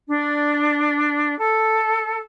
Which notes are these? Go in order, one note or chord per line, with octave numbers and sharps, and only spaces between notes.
D4
A4